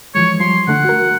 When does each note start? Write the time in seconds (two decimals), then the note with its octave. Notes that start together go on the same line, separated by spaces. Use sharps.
0.15 E3 F3 G#3 C#5
0.40 F3 G3 C6
0.68 D3 A3 D4 F#5
0.85 F#4 A#4